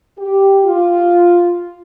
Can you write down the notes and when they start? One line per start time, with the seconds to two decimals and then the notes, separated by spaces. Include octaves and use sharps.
0.19 G4
0.65 F4